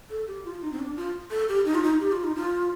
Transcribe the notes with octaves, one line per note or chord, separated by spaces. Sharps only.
A4
G4
F4
D#4
C4
D4
F4
A4
G4
D#4
F4
D#4
G4
F4
D#4
F4